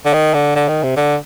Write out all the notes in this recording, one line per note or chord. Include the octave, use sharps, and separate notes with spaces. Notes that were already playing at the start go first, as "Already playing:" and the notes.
D3
D#3
D3
D3
D#3
C3
D3